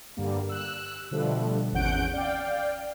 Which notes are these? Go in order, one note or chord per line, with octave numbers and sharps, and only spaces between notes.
G2 D3 G3 A#3
E6 F#6
B2 D3 F3 G3 A3
G#1 E2 C#4 F#5 G6 D7
D5 F5 G5